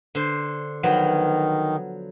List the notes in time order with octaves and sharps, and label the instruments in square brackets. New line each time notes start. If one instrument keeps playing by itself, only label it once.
[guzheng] D3 C5
[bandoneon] D#3 [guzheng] F3 F#3 B3 [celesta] F#5